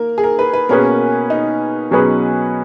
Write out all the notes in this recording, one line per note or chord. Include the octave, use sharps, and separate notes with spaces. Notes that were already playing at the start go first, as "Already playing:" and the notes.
Already playing: A#3 A#4
G#4
A#4
B4
B4
B2 A#3 C#4 G#4 A#4 B4
D#4
B2 F#3 C#4 G#4 B4